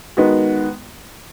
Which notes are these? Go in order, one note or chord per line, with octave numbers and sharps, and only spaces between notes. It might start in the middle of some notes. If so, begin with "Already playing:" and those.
D#3 G#3 B3 F#4